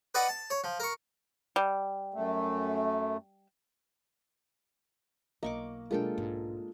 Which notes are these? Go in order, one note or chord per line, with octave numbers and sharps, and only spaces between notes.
B4 D5 D#5 F#5
A5
C#5
F3
A#4 C#6
G3
F#2 A3
B1 A#3 D#5 C#6 D6
B2 F#3 G#3 A#3 D4 F4 A4 G5
B1 G#2